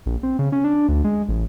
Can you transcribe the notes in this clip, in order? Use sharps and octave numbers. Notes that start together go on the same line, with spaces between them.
A#1
C4
C#3
C#4
D4
D2
G#3
A1